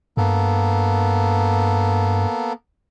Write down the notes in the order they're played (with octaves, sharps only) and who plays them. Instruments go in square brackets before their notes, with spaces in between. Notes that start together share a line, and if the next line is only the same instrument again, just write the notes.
[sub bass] G2 [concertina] A#3 B3 A4